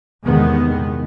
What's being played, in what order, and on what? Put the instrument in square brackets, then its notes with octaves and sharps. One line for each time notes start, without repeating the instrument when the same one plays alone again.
[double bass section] E2 C3 D#3 G#3 B3